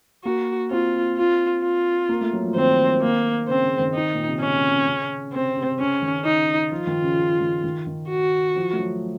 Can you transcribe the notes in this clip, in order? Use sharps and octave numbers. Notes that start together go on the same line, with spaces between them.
A#3 F#4
C4 F4
F4
F4
A#3
A3
F#3
F3
D#3 C4
A#3
C#3 C4
C#3
D#3
D#4
A#2
C3
C#3 C#4
C#3
C3 C4
C3
C#3 C#4
D#3
D#4
F3 F4
D#3
C#3
C#3
D#3
D#3
D#3
F#4
F3
A3
F#3